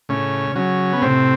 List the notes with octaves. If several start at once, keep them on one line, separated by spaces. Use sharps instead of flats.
A2 C#3 C#4
C#3 F#3 C#4
B3
A2 C3 C4